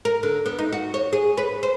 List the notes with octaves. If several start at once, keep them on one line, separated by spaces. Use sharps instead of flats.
A#4
D3
B3
D#4
F#4
C#5
G#4
B4
C5